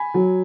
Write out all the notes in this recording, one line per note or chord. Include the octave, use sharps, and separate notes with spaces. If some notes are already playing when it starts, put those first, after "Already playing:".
Already playing: G#5 B5
F#3